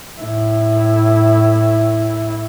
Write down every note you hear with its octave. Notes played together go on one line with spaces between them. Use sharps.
A2 E4